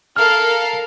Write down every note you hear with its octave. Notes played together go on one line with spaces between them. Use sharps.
A4 A#4 F5 F6